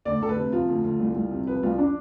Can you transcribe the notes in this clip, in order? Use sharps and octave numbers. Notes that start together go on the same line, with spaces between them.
D2 D5
D2 A4
B4
C3
F3 F4
D2
D2
C2
C2
C3
F3 B4
C2 F4
D4